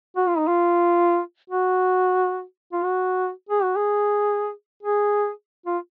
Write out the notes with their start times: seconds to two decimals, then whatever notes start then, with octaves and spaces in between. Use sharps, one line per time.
0.17 F#4
0.27 F4
0.38 D#4
0.48 F4
1.50 F#4
2.73 F4
2.83 F#4
3.49 G#4
3.63 F#4
3.76 G#4
4.83 G#4
5.66 F4